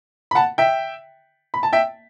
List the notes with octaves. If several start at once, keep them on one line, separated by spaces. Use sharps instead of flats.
B5
F#5 A5
E5 G5
B5
A5
E5 G5